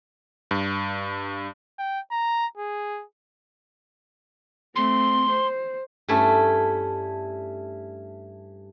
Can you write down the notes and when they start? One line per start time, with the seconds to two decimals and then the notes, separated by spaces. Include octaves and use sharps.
0.51 G2
1.79 G5
2.11 A#5
2.57 G#4
4.76 A3 C4 C6
5.30 C5
6.08 G2 A3 C#4 E4